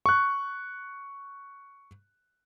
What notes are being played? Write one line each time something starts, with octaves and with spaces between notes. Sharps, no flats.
C#6 F#6